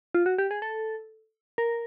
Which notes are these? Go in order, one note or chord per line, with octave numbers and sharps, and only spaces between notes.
F4
F#4
G4
G#4
A4
A#4